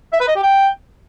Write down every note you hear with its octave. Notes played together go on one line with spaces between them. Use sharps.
E5
B4
D#5
G4
G5